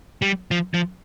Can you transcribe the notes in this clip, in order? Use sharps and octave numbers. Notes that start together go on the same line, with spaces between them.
G3
F3
F3